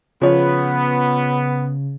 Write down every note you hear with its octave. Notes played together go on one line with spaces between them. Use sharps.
C#3 F3 B3 C#5